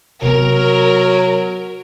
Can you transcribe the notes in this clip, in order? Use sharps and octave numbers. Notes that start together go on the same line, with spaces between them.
C3 F#3 B3 A#4